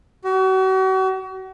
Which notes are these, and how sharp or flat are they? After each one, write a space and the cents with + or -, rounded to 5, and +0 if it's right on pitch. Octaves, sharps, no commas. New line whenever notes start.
F#4 +40